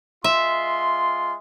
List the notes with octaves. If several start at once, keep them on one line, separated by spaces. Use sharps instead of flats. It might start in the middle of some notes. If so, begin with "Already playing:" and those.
G#3 F4 E5 C6